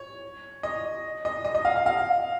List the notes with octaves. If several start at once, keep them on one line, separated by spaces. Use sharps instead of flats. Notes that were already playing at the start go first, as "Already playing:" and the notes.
Already playing: C#5
D#5
D#5
D#5
D#5
F5
F5
F5